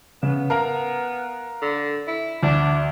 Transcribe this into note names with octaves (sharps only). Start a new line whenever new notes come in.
C#3 B3
A#4 F5 A#5
D3
E4
D2 D4